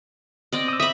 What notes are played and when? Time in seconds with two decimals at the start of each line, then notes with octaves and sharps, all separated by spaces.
0.52 C4 D5 D#5
0.68 D#6 E6
0.80 E5 B5 D#6